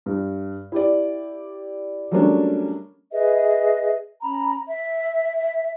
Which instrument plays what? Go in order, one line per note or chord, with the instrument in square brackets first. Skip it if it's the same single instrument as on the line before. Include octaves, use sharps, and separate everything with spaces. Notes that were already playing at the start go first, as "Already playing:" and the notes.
[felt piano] G2
E4 G4 D5
F#3 G3 A3 A#3 C#4 D4
[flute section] G#4 B4 D#5 E5
C#4 A#5 B5
E5